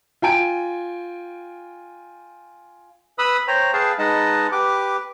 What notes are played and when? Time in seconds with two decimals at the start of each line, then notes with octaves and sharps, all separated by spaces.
0.22 F4 G5 G#5 D7
3.18 B4 B5 D#6 E6
3.48 C5 C#5 G5 A#5
3.73 G#4 B4 F5 G5 A5
3.98 G#3 D#4 B4 D#5 F#5 A5
4.52 G4 B4 D6